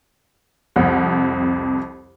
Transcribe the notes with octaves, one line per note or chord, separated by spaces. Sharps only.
C2 F2